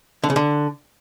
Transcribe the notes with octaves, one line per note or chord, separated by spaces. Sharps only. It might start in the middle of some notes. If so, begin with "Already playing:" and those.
D3
C#3
D3